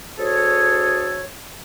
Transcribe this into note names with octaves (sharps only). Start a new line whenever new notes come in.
D2 G#4 A4 C#5